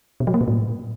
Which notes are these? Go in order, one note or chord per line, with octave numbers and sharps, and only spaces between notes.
B2
F#3
A#3
A#2
A2